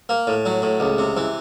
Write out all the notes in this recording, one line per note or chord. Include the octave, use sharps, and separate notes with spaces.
A#3
A2
F#3
A2
C#2
C3
E3